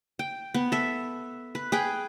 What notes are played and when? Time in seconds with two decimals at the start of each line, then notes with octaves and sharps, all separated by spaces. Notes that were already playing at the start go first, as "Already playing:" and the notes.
0.19 G5
0.54 B3
0.72 A4 E5
1.55 B4
1.72 G#4 B4 G5